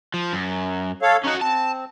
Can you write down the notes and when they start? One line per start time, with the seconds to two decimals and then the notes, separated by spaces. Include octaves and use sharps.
0.14 F3
0.33 F#2
1.02 A4 C#5 F5
1.24 C#4 D#4 F#4
1.41 C4 A5